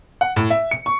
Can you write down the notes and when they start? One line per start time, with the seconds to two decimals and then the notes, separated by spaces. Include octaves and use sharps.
0.21 F#5
0.36 A2
0.50 E5
0.71 C#7
0.86 C#6